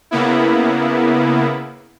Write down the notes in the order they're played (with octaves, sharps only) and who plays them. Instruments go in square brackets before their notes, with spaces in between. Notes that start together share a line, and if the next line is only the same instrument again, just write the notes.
[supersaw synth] C#3 A#3 B3 E4